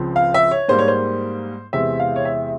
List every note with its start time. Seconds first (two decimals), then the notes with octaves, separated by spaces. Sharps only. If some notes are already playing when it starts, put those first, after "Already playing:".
Already playing: C#2 C#3 F3 C4
0.16 F5
0.34 E5
0.51 C#5
0.68 G#2 G3 A#3 C5
0.79 C#5
0.88 C5
1.73 E2 C3 E3 G#3 C4 E5
2.00 F5
2.16 C#5
2.25 E5